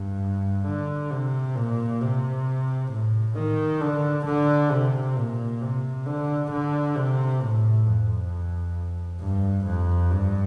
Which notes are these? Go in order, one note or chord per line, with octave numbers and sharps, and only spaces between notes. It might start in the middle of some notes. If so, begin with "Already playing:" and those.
Already playing: G2
D3
C3
A#2
C3
A2
D#3
D3
D3
C3
A#2
C3
D3
D3
C3
A2
F2
G2
F2
G2